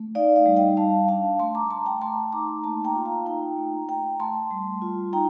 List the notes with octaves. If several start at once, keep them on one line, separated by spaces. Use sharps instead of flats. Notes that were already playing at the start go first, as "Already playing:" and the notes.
Already playing: A3
D#4 D5 F5
D5 F5
G3
D#5 G5
G3 F5 A5
D4 F5 A5
A3 A5 C6
A#5 D6
A3 A5 C6
G5 A#5
A3 A5 C6
D#4 A#5 D6
A#3 A5 C6
G5 A#5
F4
F5 A5
D#4 G5 A#5
A3
A3 G5 A#5
A3 A5 C6
G3
F4
D#4 G5 A#5